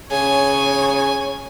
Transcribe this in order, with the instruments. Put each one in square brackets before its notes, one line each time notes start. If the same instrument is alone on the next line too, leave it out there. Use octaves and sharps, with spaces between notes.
[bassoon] C#3 [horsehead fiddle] C#5 [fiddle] G#5